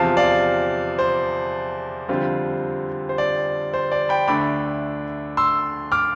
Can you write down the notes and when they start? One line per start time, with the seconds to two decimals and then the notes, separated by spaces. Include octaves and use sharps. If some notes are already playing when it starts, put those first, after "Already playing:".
Already playing: E2 C3 F3 C4 F4 F5 A5
0.17 D5 F5
0.99 C5
2.08 F2 D3 G3 C4 F4
3.09 C5
3.18 D5
3.74 C5
3.92 D5
4.09 G5 B5
4.27 D2 D3 A3 D4 B5 D6
5.37 C6 E6
5.92 D6 F6